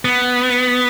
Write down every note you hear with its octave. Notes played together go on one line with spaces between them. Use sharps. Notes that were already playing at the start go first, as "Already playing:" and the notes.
B3